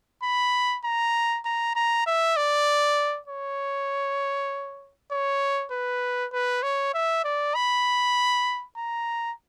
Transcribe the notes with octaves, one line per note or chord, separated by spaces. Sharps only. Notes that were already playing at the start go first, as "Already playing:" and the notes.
B5
A#5
A#5
A#5
E5
D5
C#5
C#5
B4
B4
C#5
E5
D5
B5
A#5